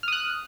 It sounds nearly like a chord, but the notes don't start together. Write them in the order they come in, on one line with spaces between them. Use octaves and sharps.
F6 D#6 F#6